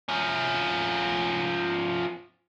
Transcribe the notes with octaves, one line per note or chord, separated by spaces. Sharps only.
F3 C#4